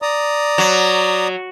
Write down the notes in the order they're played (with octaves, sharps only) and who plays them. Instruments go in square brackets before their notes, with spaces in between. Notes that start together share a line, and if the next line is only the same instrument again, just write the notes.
[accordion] D5 A#5 D#6
[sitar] F#3